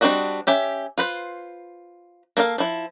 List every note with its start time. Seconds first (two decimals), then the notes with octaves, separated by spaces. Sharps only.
0.01 G3 C4 D4 F#4 D#5
0.47 C#4 G4 E5
0.98 F4 B4 C5
2.37 A#3 A4 D5 F5
2.58 F3 E4